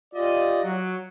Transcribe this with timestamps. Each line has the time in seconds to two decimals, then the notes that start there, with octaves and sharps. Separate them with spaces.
0.14 F4 G4 D5 D#5
0.63 F#3